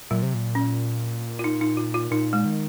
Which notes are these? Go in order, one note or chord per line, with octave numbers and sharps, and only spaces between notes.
A#2 F#3
C3
A#2
C#4
F4
D#4
D#4
F4
F4
A#2 D#4
G#3
D#3